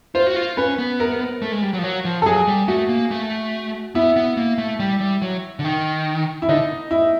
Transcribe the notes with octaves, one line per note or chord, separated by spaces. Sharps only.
F4 C5
F#4
F4
C#4 B4
B3
A#4
A3
G#3
G3
F#3
F3
F#3
F3
A4
F#3 G#4
G3
A3 F#4
A#3
A3
B3 E4
B3
A#3
A3
G3
G3
F#3
D3
D#3
E4
D3 D#4
E4